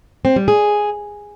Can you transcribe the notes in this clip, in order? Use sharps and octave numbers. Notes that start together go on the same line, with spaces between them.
C4
G3
G#4